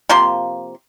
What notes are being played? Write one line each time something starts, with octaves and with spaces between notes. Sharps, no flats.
C3 F3 A#3 C6